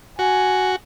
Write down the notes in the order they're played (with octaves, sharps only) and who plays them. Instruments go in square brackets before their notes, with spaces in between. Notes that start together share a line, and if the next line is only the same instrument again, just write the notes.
[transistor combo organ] F#4 [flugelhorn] G#5